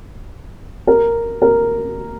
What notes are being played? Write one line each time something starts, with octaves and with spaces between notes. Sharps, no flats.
A#4
A#4